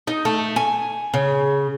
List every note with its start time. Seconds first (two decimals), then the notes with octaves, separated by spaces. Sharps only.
0.07 D#4
0.25 A3
0.56 G#5
1.14 C#3